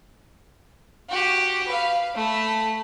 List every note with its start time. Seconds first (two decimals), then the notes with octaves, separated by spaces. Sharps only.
1.09 F#4 G4
1.67 B4 F5
2.15 A3 B5